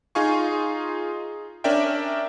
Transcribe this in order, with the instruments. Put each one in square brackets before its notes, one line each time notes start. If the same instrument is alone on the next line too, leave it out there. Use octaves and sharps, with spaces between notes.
[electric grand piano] D#4 F4 G#4 F5 G#5 C#6
C#4 D4 A#4 D5 E5 G5